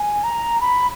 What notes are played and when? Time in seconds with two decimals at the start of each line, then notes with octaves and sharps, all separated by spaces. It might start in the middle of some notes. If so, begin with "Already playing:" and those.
Already playing: G#5
0.24 A#5
0.61 B5